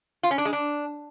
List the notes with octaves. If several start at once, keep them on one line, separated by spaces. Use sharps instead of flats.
F4
C#4
D4
G#3
D4